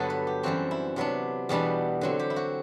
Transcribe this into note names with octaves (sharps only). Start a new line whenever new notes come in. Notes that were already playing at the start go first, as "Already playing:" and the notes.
Already playing: G2 D3 F#3 B3 D4 A4
B4
G4
F#2 E3 G3 C4 F#4
E4
C3 F#3 B3 D4
E2 B2 G3 B3 D4
D3 F#3 C4
G4
E4
F#4